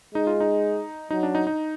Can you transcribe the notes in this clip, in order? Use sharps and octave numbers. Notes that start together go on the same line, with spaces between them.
G#3 D#4
F4
D#4
F#3 D#4
D4
D#4
D#4